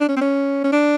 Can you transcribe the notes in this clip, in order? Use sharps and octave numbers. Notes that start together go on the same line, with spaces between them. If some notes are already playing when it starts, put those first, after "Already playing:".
D4
C#4
C4
C#4
C#4
D4